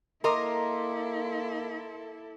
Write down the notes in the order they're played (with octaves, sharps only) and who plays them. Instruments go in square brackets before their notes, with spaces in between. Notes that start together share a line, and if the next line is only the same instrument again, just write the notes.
[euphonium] A#3 [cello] E4 A4 [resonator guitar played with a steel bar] A#4 D#5 [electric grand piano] A#5 C6 D6